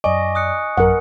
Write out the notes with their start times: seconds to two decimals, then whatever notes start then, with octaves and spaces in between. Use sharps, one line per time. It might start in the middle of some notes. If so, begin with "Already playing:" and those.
0.04 F#2 D5 D#5 G#5 C#6 D6
0.35 D#6 F#6 C#7
0.77 A1 F#2 A#4 F#5